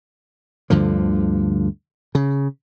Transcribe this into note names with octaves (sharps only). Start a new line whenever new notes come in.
D2 G2 D3 F3
C#3